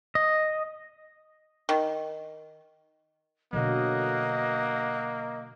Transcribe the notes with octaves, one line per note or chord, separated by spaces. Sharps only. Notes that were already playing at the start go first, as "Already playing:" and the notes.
D#5
D#3
B2 D3 F#3 A#3 D#5 F#5